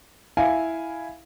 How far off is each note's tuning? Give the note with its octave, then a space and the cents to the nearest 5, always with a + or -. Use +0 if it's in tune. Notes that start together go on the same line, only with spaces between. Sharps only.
E4 +0 F5 +0 G#5 +0